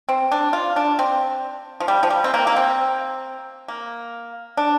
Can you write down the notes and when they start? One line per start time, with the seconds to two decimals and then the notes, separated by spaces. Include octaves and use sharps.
0.09 C4
0.32 D4
0.53 F4
0.76 D4
0.99 C4
1.80 F3
1.88 G3
2.03 F3
2.10 G3
2.24 C4
2.34 A#3
2.47 A#3
2.56 C4
3.68 A#3
4.57 D4